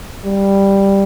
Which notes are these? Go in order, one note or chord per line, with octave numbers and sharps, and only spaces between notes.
G3